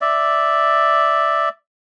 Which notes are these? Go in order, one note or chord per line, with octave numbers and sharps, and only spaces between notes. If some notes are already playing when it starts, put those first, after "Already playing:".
D5 E5